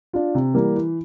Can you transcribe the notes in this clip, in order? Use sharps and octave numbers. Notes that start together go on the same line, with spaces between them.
D4 F4
C3
E3 G3 A#3
E3